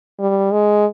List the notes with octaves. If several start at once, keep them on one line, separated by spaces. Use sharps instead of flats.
G3
G#3